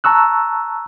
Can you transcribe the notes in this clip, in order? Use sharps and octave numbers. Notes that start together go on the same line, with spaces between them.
A5 A#5 C#6 E6 F#6